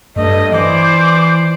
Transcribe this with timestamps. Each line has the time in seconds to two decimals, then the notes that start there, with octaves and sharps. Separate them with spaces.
0.16 G2 A3 D#5
0.53 E3 C5 D5 D6